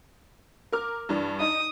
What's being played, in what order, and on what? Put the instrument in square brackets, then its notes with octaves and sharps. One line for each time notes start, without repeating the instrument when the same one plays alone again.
[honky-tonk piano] A#4 D6 F6
G2 E3 D4
[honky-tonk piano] D#4 [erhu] D#6